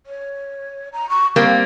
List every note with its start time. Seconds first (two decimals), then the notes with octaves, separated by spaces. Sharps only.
0.06 C#5
0.93 A#5
1.09 C#6
1.36 G3 A#3 C4 F5